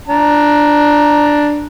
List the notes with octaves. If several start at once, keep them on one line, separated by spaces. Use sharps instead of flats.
D4 A#5